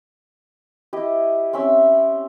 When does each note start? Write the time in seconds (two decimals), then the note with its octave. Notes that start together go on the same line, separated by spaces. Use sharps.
0.93 E4 G4 D#5
1.53 C4 C#4 E5 E6